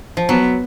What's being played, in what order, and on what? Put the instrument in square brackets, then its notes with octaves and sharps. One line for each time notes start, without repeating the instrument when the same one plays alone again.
[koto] F3
[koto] F#3 [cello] B3